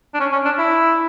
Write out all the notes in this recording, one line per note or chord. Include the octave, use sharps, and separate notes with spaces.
D4
C#4
C#4
D4
E4